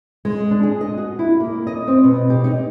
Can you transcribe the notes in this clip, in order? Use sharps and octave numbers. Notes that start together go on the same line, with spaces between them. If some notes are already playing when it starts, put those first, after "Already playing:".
G#3
D4
G#4
D#5
F#4
E4
A#3
D#5
C4
B2
G4
D#4